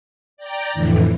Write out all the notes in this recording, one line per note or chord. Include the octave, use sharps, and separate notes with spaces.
D5 G5 A#5
F2 A2 D3 E3